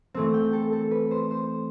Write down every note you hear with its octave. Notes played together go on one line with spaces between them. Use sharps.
E3 A3 C4
G5
A4
A4
B4
C5
C5